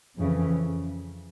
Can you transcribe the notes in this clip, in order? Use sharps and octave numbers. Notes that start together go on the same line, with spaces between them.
F2 C#3 E3